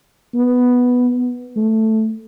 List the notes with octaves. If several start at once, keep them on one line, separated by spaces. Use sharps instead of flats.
B3
A3